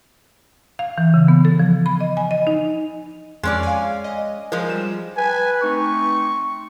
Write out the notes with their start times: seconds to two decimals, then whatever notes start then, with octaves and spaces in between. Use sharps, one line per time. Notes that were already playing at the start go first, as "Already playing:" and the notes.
0.79 F5
0.98 E3
1.14 C#3
1.28 B3
1.45 A4
1.60 F3
1.86 B5
2.01 D#5
2.17 G#5
2.31 D#5
2.47 D#4
3.43 F2 G#3 C#4 D5
3.63 F5 G#5
4.04 D#5
4.52 F3 G#3 A#4
4.69 G3 E7
5.17 B4 G#5
5.62 A3 C4 D#4 C#6